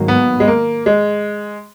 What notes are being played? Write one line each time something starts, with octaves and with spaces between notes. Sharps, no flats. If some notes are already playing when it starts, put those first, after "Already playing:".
Already playing: G#2 D#3 F#3 A#3
B3
G#3
A#3
G#3